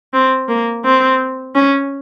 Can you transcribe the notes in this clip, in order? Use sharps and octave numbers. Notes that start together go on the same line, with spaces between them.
C4
A#3
C4
C#4